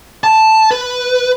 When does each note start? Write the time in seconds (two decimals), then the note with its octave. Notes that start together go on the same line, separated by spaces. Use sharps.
0.24 A5
0.71 B4